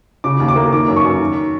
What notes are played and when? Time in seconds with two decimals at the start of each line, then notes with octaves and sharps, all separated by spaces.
0.24 C#3 D6
0.40 D#2
0.48 D6
0.56 A#3
0.72 D#3 D6
0.88 F#2
0.96 C#6
1.05 F#2
1.20 D#3